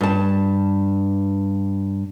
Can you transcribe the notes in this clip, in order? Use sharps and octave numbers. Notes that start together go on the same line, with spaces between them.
G2 A5